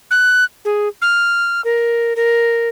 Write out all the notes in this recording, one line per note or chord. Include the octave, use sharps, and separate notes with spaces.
F#6
G#4
F6
A#4
A#4